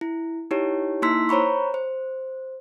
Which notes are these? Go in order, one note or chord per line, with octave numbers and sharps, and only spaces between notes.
E4
D#4 E4 G4 C#5
A#3 D#4 E4 C6 E6 B6
C5 C#5 A#5 B5 C#6
C5